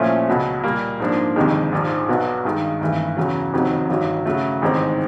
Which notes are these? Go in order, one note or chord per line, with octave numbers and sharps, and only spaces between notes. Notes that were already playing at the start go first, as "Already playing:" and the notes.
Already playing: A#2 F3 A3 C#4 E4
C#2 B2 F#3
A#2 G3 A#3
G#2 F3 A#3 D4
G1 F2 C3 D#3 G#3
A#1 G#2 F3
B1 B2 F#3 B3
G2 D#3 G#3
G#1 G2 E3 A3
E2 C#3 F#3
F#1 F2 C3 D#3 F#3
A1 G2 D#3 F#3
C#3 F#3 A3
A1 G#2 D#3 G#3 C4